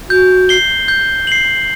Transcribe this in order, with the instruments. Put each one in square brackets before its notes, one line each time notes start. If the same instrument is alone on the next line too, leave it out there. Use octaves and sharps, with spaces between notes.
[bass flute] F#4 [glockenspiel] G6
[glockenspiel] C7 G7
G6
C7 F#7